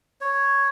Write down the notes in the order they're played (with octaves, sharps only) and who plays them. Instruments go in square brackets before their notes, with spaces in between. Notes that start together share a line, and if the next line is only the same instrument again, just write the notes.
[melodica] C#5